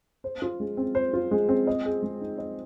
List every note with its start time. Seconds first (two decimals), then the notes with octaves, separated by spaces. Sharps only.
0.24 C5
0.42 F4
0.60 G#3
0.77 C4
0.95 C5
1.14 F4
1.31 G#3
1.49 C4
1.67 D#5
1.85 G#4
2.02 G#3
2.21 D#4
2.38 D#5